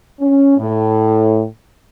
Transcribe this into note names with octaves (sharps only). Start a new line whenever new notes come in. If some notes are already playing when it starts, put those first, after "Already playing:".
C#4
A2